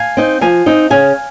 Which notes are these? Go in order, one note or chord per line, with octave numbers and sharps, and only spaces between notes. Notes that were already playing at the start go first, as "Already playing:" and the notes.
Already playing: F5 G#5
C4 D#4
F3 F5 G#5
C4 D#4
C#3 F5 G#5